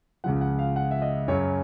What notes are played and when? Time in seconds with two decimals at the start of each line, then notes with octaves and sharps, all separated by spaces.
0.24 C#2 C#3 F3 F#5
0.41 F#5
0.59 F5
0.76 F#5
0.91 E5
1.02 D#5
1.28 F#2 C#3 F#3 C#5